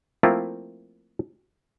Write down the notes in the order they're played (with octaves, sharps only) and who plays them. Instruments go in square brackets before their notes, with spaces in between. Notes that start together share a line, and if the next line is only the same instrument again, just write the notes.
[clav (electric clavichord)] F3 A3 A#3 C4 E4 F4